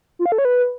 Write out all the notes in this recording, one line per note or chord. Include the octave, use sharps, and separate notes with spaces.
F4
F5
A4
C#5
B4